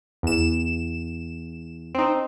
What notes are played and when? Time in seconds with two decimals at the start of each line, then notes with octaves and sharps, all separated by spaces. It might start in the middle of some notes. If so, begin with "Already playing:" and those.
0.23 E2 E7
1.94 C4 D#4